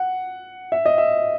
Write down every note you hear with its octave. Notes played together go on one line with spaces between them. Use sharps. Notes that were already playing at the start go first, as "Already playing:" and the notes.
Already playing: F#5
E5
D#5
E5